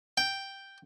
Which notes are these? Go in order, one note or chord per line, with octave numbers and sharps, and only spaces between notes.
G5